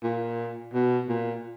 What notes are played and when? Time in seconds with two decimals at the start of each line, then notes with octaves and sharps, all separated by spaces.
0.04 A#2
0.74 B2
1.09 A#2